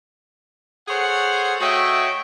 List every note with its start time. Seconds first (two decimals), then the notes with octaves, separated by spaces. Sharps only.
0.88 G#4 A4 C5 C#5 F#5
1.60 A3 F#4 C#5 D#5 E5 G5